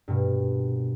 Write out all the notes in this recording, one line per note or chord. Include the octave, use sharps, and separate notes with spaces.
G2 B2 A#3